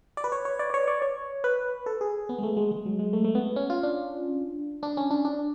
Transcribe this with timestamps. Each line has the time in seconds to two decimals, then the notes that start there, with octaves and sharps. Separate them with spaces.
0.17 D5
0.24 B4
0.32 C#5
0.45 C#5
0.59 D5
0.70 D5
0.74 C#5
0.88 D5
1.02 C#5
1.44 B4
1.86 A4
2.01 G#4
2.29 B3
2.38 G#3
2.43 A3
2.57 G#3
2.71 G#3
2.86 F#3
2.99 G#3
3.13 A3
3.24 A3
3.35 B3
3.56 C#4
3.70 F4
3.83 D4
4.83 D4
4.97 C#4
5.10 D4
5.25 D4